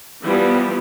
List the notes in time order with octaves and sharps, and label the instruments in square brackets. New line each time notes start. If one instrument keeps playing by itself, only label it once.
[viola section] E3 F3 G3 B3